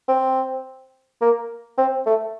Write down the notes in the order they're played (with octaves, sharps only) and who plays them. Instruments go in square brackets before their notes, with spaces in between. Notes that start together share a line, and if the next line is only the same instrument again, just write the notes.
[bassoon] C4
A#3
C4
A3